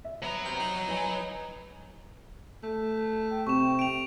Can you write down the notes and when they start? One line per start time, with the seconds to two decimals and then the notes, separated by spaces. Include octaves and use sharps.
0.04 E5
0.22 F#3 B3 A#5
0.45 C3
0.60 D#4
0.87 B4 D#5 G#5
2.63 A3
3.31 G5
3.47 C3 G5 C#6 E7
3.79 D7 F7